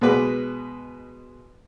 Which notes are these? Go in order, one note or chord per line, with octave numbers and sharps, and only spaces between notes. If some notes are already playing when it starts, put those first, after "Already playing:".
B2 G#3 B4 D6